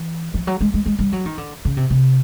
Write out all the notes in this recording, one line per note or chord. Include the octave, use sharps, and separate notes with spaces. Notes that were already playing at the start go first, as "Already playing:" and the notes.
Already playing: E3
F3
F#3
G#3
G#3
G#3
G3
F#3
D#3
D3
C#3
C3
C3